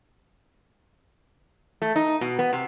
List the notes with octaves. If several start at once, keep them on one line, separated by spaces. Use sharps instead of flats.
A3
D#4
B2
B3
C3